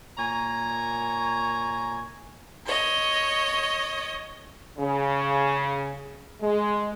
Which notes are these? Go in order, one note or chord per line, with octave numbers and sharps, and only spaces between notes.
A#2 C#5 G#5 A#5
C#5 D#5
C#3
G#3